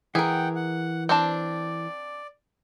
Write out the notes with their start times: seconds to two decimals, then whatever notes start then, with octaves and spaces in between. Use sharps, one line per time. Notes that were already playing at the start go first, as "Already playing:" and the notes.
0.15 E3 G#4 A#4 F#5 G5
0.56 F#5
1.09 C4 D4 D5 A5